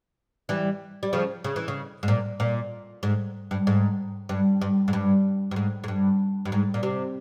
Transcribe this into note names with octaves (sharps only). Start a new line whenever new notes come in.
E3 G3
G3
C#3 F3
C#3
E3
C#3
G#2
A#2
A#2
G#2
G2
G#2
G2
G2
G#2
G2
G2
G#2
G#2
G2
G2
G#2
A#2
C3